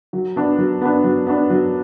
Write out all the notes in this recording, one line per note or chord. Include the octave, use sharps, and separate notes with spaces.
F#3
B3 D4
F#3
B3 D4
F#3
B3 D4
F#3